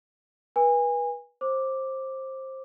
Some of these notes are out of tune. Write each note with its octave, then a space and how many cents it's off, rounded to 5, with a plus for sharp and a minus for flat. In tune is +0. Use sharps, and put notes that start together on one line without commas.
B4 -30 G#5 -25
C5 +20 D6 +0